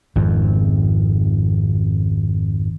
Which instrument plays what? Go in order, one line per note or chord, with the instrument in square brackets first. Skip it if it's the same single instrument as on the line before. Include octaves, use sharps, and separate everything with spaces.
[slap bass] G#1 F2